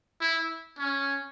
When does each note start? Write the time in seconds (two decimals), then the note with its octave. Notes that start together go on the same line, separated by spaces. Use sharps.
0.21 E4
0.78 C#4